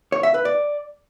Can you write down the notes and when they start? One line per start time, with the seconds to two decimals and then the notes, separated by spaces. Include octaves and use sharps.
0.12 C#5
0.23 E5
0.34 B4
0.45 D5